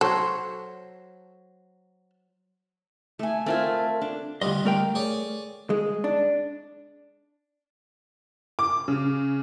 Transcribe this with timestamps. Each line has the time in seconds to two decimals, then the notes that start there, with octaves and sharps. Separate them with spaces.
0.01 F#3 A4 C5 C#5
3.19 A3 E5 G#5
3.46 A3 C4 F4 A#4 G#5
4.01 D4
4.42 D2 G2 G3 F4 D#5
4.65 A3 A#4 G5
4.95 G#4 C#5 D5
5.70 G#3
6.04 D4
8.59 D6
8.88 C#3